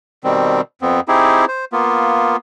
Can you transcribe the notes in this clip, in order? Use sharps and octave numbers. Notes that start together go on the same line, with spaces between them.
B2 D#3 G3 C4
F2 B3 C4
C4 D#4 E4 G4 G#4
C5
A#3 B3 F4